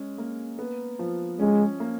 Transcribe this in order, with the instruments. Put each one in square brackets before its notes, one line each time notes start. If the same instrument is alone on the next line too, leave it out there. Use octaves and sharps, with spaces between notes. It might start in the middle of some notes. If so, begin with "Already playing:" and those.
Already playing: [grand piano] G#3 C#4
A#3
B3
F3
[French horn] G#3 [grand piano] C#4
[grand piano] A#3